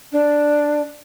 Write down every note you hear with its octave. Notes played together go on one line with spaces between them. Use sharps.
D4